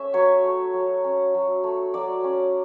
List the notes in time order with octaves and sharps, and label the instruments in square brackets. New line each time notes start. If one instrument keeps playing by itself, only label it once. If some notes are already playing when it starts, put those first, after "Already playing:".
Already playing: [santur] A3 C#4 E5
F#3 C#5
A3
F#3
C#4
F#3
A3
F#3 D5
C#4